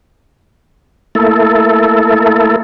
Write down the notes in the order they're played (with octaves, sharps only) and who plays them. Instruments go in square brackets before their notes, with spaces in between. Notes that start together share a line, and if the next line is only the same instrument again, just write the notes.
[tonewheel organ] A3 A#3 E4 A4